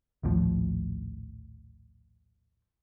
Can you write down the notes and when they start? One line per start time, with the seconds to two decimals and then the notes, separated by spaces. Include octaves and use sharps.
0.23 A#1 D#2 A2 F3